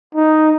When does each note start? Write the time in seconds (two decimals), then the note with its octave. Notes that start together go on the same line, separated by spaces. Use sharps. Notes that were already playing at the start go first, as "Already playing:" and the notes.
0.15 D#4